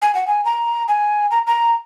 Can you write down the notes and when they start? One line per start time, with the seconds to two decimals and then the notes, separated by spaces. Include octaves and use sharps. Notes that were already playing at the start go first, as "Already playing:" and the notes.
0.02 G#5
0.15 F#5
0.27 G#5
0.45 A#5
0.88 G#5
1.31 A#5
1.47 A#5